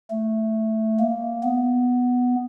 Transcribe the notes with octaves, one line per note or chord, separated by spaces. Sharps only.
A3
A#3
B3